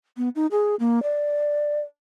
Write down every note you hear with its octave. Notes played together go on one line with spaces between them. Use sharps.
B3
D#4
G#4
A#3
D5